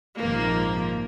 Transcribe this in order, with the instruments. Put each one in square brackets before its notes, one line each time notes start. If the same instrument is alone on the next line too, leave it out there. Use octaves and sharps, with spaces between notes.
[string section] A#1 G#2 C3 D#3 F3 A#3